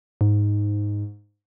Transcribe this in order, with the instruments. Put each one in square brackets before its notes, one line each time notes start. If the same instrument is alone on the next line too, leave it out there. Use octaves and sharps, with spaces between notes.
[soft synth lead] G#2